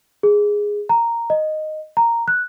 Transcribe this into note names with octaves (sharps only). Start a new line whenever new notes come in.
G#4
A#5
D#5
A#5
F#6